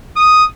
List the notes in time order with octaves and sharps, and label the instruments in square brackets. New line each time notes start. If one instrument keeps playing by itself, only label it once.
[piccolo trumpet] D#6